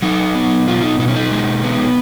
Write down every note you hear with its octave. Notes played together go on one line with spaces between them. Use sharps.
F#3 D#4
B3
B2 F4
D#4
B2 D#4
C#4
D#4
G#3
B3